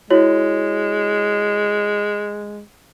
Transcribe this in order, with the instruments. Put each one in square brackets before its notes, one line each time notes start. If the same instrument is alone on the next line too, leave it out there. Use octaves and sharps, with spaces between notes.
[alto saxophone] G#3 [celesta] E4 F#4 C#5